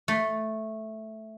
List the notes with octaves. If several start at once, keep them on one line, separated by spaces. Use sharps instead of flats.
A3